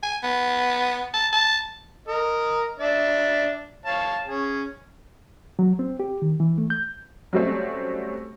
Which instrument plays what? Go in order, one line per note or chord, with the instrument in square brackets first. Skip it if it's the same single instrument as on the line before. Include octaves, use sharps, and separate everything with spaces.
[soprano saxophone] G#5
B3
A5
A5
[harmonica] A#4 D#5
D4 D5 E5
C#5 F5 A5
C#4 G#4
[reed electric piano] F#3
C4
G4
D#3
E3
A3
G6
[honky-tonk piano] F#3 G3 A3 C4 C#4